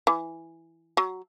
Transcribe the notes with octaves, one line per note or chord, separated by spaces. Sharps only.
E3
F#3